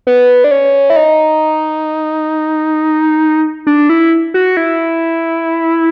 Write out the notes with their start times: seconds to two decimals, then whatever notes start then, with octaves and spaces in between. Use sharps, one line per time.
0.07 B3
0.44 D4
0.51 C#4
0.90 E4
0.96 D#4
3.67 D4
3.89 E4
4.34 F#4
4.57 E4